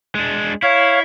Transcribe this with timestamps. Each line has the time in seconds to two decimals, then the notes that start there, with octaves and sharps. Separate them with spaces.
0.15 G#3 D4
0.62 E4 C#5 F5